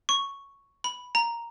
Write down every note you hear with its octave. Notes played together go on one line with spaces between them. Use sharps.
C#6
B5
A#5